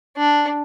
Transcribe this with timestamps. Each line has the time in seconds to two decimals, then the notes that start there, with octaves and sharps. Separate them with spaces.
0.17 D4